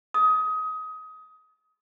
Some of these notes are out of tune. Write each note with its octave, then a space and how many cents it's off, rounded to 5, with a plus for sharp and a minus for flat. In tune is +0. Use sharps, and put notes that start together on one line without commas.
D#6 +20